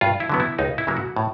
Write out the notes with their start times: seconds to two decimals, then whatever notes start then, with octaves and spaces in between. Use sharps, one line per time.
0.01 G2 F4
0.20 E4
0.29 D3 F#3 B3
0.40 E4
0.59 C#2 D#4
0.78 E4
0.87 C#3 F#3 A#3
0.97 F#4
1.16 A2